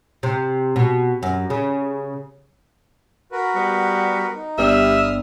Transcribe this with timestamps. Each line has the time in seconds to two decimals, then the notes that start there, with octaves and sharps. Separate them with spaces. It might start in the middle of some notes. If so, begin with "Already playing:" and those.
0.23 C3
0.76 B2
1.23 F#2
1.50 C#3
3.32 F#4 A#4 B4
3.56 G3 B3
4.35 D#4
4.58 G1 G3 B3 D4 E5 D#6 F6